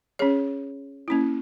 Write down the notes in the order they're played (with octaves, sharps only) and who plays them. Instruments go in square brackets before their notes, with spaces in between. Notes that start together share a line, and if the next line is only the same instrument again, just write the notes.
[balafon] C#4 G#4 C#5
A#3 C#4 E4